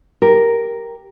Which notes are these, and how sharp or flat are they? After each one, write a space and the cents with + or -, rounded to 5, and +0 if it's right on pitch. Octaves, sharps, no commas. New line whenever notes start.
G4 +0 A#4 +0